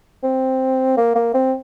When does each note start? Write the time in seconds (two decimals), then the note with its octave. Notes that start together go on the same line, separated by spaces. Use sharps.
0.23 C4
0.97 A#3
1.15 A#3
1.34 C4